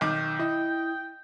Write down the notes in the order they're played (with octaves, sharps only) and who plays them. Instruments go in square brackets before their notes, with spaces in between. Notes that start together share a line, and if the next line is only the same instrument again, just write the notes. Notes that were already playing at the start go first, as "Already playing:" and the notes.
[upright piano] B1 D#3 D6 [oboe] G5
[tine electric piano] E4 [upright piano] D#5